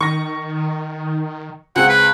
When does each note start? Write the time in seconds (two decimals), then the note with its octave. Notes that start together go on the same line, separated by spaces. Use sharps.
0.01 D#3 C#6 A#6
1.76 C#2 C4 G#4 F#5
1.89 B4